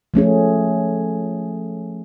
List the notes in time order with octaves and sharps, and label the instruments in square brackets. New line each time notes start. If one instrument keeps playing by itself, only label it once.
[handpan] F3 A3 C#4 G#4